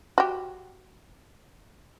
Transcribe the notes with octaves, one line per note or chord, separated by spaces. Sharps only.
F#4 G4